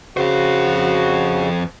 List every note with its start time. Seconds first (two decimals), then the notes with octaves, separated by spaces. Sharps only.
0.17 F2 C#3 F#4 C5